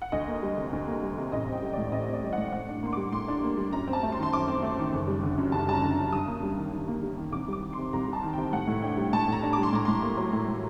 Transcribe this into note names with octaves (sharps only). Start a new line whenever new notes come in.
F#5
D2 D#5
A#3
G3
C3
D2
A#3
G3
C3
A1 D#5
C4
G5
G3
A2 D5
A1 D#5
C4
D5
G3
F#5
A2
A2 F#5
D4
A#3 C6
G3 D6
A2 C6
D4
A#3
G3
F#2 A#5
C4
A5
A3
C6
D#3
C6
F#2 D6
C4
A3
D#3
F#1
G3
D3
F#2
F#1 A5
G3 A5
A#5
D3
F#2
G2 D#6
A#3
G3
D#3
G2
A#3
G3
D#3
C2 D6
G3 D6
D#3
C6
C3
C2 A#5
G3
A5
D#3
C3 G5
A2 F#5
A2
D4 G5
G3
A2 A5
A2 A#5
D4
G3 D6
C6
A2 A#5
A2 C6
A#3
F#3
A2
A2